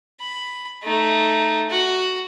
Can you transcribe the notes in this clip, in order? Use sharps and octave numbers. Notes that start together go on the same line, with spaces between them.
B5
A3 D#4
F#4